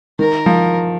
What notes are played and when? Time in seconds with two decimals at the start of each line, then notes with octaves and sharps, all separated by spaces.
0.19 D#3 A#4
0.46 F3